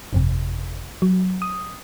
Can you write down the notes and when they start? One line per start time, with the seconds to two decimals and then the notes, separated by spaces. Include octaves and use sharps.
0.13 G1 F2 C3
1.02 F#3
1.42 D#6